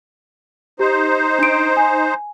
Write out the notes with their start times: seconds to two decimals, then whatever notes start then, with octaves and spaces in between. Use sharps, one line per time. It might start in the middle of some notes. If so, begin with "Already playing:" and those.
0.79 D#4 G4 C5
1.39 D4 D7
1.77 G#5